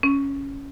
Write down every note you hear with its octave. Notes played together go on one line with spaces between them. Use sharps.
C#4